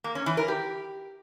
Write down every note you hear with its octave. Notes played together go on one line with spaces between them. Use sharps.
A#3
C#4
E3
A#4
G4